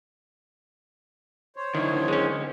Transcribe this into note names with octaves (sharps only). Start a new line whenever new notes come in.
C5 C#5
D3 D#3 E4
G#3 C#4